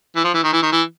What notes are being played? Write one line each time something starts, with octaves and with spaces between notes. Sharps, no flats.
E3
F3
E3
D#3
E3
D#3
E3